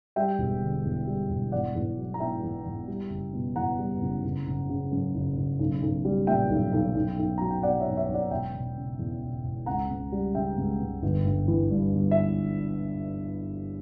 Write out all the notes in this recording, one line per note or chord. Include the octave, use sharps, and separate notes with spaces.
G3 E5 G5
E1
D3
E2
G3
E1
E2 D5 F#5
E2
F#3
A#5
B2 E5 G5
E2
E2
G3
F#1
B2
E2 F#5 A#5
G3
F#1
F#1
F#1
C#3
F#2
F#1
F#1
B1
B1
G3
A#2 E5 G5
B1
B1
B1
B1
F#3 A#5
G5
B2 D5 F#5
C#5 E5
B1
C#5 E5
B1
D5 F#5
E1 E5 G5
E1
C#3
E2
E1
E1
C#2 F#5 A#5
C#2
G3
C#3 E5 G5
C#2
C#2
G1
G1
E3
G2
G1
E5